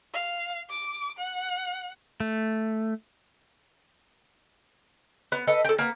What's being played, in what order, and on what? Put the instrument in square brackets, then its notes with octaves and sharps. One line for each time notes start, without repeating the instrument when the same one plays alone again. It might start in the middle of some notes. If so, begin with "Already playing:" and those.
[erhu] F5
D6
F#5
[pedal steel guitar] A3
[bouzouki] B3
A4 B4 D#5
G4 A4
A#3 B3